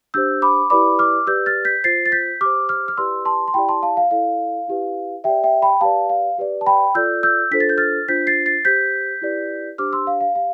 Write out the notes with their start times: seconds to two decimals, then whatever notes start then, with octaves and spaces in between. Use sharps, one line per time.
0.14 D4 G4 C5 E6 G6
0.42 B5 D6
0.70 E4 G4 B4 D5 B5 D6
0.99 D6 F6
1.27 G4 B4 D5 E6 G6
1.46 F6 A6
1.65 G6 B6
1.84 F4 C5 A6 C7
2.06 A6
2.12 G6 B6
2.41 G4 C5 D6 F6
2.69 D6 F6
2.88 F6
2.97 E4 G4 B4 D5 C6 E6
3.25 A5 C6
3.48 C6
3.54 E4 G4 D5 G5 B5
3.69 A5 C6
3.82 F5 A5
3.97 F5
4.11 E4 A4 D5 F5
4.68 E4 G4 B4
5.24 G4 D5 E5 G5
5.44 E5 G5
5.62 G5 B5
5.81 G4 B4 D5 F5 A5
6.09 F5
6.38 G4 B4 D5
6.61 A5
6.66 G5 B5
6.95 F4 A4 D5 E6 G6
7.23 E6 G6
7.51 D4 F4 A4 C5 B6
7.60 A6
7.69 G6
7.78 F6 A6
8.08 D4 F4 C5 G6 B6
8.27 A6 C7
8.46 A6 C7
8.65 G4 C5 G6 B6
9.22 E4 G4 B4 D5
9.78 D4 G4 C5 D6 F6
9.93 C6 E6
10.07 F5
10.21 F5
10.35 G4 F5